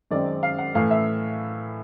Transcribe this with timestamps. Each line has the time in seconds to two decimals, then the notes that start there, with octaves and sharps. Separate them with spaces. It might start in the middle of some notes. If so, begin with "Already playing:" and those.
0.11 F#2 D#3 G#3 C4 D5
0.43 F5
0.58 F#5
0.75 A2 E3 A3 F5
0.91 E5